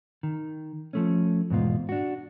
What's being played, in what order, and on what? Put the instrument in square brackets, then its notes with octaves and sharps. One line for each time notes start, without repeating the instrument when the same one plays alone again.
[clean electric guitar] D#3
F3 A3 C#4
E2 G#2 B2 F4
D4 F#4